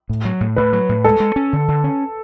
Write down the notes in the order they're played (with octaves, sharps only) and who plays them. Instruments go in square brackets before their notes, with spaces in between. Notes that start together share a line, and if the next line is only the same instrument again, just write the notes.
[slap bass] A2
F#3
A2
[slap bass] A2 [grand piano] B4
[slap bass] F#3
A2
[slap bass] G#3 [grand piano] A4
[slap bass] G#3
C#4
D3
D3
C#4